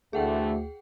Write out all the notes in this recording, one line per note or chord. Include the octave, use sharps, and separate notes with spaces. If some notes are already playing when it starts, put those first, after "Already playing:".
D2 D3 E3 A3 G#4 F#5 G5